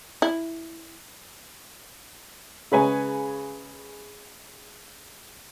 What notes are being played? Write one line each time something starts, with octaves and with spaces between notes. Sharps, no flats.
E4
C#3 G#3 B4 C#5 G#5 A#5